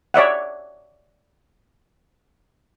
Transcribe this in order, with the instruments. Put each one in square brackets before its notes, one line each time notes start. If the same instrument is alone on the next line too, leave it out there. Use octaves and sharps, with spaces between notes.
[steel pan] C#5 D5 E5 F#5